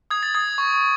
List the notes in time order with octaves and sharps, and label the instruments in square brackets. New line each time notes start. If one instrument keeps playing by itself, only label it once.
[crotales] D#6 G#6
A6
D#6 G#6
C#6